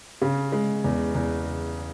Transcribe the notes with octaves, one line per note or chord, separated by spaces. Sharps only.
C#3
G#3
E2
E2